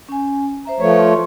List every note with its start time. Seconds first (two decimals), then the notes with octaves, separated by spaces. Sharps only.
0.09 C#4 G#5
0.65 C5 E5 A#5
0.80 F3 A3 B4 C#5 F5
0.97 F4 C6 C#6